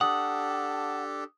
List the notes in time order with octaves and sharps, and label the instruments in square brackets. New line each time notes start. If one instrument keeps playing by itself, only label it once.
[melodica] D4 G4 A4 [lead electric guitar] F#5 [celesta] D#6